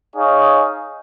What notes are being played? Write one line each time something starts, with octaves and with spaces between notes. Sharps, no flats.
D#4 G#4 C#5 F5